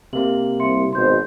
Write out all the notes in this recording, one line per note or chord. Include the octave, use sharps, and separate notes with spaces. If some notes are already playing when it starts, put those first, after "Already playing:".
C3 A#3 F#7
C2 E5 C6 C#7
G#1 B2 C5 C6 G6